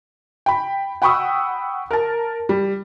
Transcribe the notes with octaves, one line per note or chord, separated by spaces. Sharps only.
G5 B5
F#5 G5 B5 C#6 D#6 E6
A#4 A5
G3